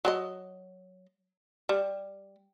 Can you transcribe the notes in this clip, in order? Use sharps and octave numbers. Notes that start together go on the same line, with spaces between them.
F#3 G4 D#5
G3